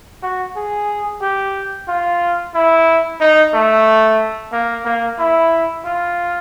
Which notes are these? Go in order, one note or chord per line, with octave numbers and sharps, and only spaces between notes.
F#4
G#4
G4
F4
E4
D#4
A3
A#3
A#3
E4
F4